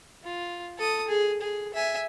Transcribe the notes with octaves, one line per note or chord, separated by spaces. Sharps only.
F4
A4 D#6
G#4
G#4
E5 G#5